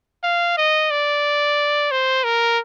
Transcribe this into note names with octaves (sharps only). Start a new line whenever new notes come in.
F5
D#5
D5
C5
A#4